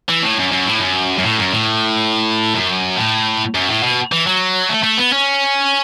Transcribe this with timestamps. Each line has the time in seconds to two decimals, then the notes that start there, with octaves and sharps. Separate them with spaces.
0.09 E3
0.23 A2
0.38 F#2
0.51 F#2
0.66 A2
0.80 F#2
1.18 F#2
1.24 A2
1.38 F#2
1.52 A2
2.54 F#2
2.96 A2
3.55 F#2
3.69 A2
3.83 B2
4.12 E3
4.27 F#3
4.69 A3
4.83 A3
4.98 B3
5.13 C#4